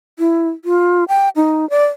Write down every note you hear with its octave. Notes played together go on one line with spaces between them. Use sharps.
E4
F4
G5
D#4
D5